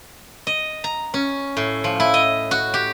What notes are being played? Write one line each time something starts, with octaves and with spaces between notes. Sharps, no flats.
D#5
A#5
C#4
A2
F3
E4
D#5
F#4
G4